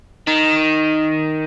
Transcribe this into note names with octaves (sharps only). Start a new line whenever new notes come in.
D#3